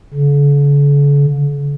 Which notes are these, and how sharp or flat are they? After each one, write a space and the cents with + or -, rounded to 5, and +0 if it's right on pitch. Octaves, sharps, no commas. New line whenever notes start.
D3 -45